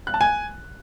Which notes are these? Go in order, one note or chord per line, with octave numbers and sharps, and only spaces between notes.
F#6
A5
G#5